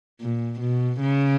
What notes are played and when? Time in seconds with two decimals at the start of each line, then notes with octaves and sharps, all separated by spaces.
0.21 A#2
0.61 B2
1.01 C#3